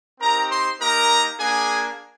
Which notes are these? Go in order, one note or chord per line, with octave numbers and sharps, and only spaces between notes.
C4 D#4 G4 A#4 A#5
C5 C6
A#3 D#4 G4 A#4 A#5
A#3 D4 G#4 G#5